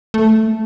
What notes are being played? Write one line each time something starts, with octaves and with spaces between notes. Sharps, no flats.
A3